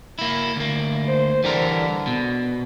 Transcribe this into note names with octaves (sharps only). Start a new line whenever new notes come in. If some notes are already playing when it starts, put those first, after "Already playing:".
A#3 E4
D2 A#3
C5
D3 E3 G3 A#4
B2